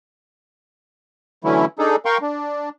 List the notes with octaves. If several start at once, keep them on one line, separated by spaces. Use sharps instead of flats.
D3 E3 F#3 A3 C#4 E4
D4 D#4 G#4 A4
A#4 F5 G5 C6 C#6
D4